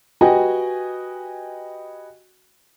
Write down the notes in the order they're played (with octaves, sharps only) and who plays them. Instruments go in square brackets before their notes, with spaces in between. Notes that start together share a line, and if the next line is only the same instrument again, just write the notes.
[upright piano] F#4 G4 B4 D#5 G5 G#5